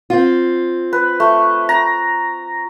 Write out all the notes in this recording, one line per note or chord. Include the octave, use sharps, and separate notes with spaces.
C4 F4
B4
A3
A#5